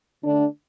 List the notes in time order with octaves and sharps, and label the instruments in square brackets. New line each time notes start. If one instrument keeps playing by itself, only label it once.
[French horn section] D3 A3 D4